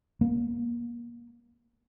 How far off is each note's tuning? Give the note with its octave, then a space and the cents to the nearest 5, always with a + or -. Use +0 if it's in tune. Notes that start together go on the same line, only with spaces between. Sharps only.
A#3 +30